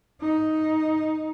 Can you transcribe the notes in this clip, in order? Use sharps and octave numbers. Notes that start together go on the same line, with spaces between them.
D#4